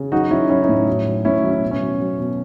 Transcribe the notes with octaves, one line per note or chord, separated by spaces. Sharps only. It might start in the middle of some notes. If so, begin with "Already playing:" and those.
Already playing: C#3
F#3 D#4 F#4
F#3 C#4 E4
F#3 C#4 E4
D#4
A2
F#3
F#3
A2 C#4 E4
F#3
C#4
B2
C#4
F#3
F#3
B2